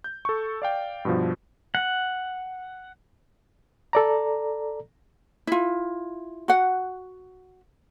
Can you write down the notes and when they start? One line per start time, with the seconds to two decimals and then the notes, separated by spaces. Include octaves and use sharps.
0.04 G6
0.25 A4 C#6
0.62 D5 F5 G5
1.05 G2 B2 F3
1.75 F#5
3.93 A4 D5 A#5
5.47 E4 F4
6.48 F#4 F#5